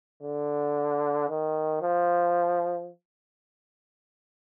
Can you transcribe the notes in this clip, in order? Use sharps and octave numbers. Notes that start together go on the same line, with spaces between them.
D3
D#3
F3